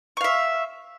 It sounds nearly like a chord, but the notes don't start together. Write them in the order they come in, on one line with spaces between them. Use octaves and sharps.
C#6 F5 E5